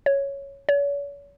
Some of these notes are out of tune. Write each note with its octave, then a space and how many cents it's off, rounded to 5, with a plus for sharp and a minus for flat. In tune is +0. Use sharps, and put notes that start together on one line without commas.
C#5 +0
C#5 +40